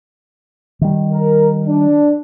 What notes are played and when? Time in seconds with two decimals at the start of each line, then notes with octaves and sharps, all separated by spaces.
0.81 D#3 G3
1.12 A#4
1.67 D4